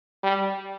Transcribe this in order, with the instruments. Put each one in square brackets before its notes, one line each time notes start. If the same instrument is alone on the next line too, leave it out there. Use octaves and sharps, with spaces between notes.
[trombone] G3